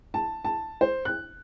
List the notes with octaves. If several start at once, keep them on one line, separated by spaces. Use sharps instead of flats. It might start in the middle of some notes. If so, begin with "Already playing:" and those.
A5
A5
C5
F#6